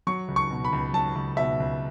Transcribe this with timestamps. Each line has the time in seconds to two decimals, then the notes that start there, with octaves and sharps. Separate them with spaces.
0.07 F#3 C#6
0.28 C#2
0.36 C#6
0.50 B2
0.65 B5
0.73 C#2
0.93 F#3 A5
1.15 C#2
1.37 B2 E5
1.60 C#2